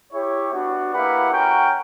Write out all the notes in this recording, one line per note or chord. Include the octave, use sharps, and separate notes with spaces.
E4 G4 C#5
B3 D4 F#4
A#3 E4 G4 B4 F#5
C#4 F#4 A#4 C#5 G5